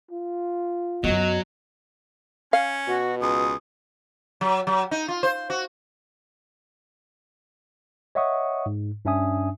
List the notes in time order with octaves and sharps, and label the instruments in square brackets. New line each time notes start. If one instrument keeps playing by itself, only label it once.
[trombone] F4
[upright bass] F#2 B3 [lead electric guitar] F#3 [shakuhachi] D#5
[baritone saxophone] C#4 [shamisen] F5
[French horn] B2 [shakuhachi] F#4
[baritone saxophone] C#2 [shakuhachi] D#6
[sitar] F#3
F#3
D#4
F4
C5
F#4
[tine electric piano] C#5 D#5 E5 F#5 C#6 D#6
G#2
G2 C#4 D4 E5 G#5 D#6